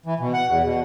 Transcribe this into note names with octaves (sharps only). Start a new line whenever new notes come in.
E3
B2
F#5
E2
B2